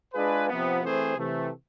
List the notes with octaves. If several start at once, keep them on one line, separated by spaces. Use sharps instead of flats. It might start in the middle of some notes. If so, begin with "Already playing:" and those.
G#3 D4 F4 G#4 B4
C3 F3 B3
E3 A3 C4 G#4 C5
C3 E3 A3